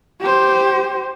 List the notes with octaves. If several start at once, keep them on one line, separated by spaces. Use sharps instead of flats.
G4 C5